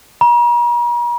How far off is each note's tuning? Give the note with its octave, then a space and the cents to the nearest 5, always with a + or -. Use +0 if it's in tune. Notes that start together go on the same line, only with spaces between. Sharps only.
A#5 +45